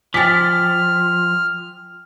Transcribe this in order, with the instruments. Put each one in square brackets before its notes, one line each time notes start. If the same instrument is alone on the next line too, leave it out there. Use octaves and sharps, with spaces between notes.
[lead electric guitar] F3 [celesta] G5 G#5 D6 [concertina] F6 [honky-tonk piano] A6 B6